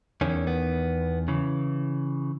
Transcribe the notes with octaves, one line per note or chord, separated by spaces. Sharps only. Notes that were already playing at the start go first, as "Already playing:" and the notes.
E2 D#3 C#4
B3
C#3 E3